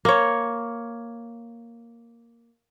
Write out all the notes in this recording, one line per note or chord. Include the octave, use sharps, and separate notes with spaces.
A#3 C#5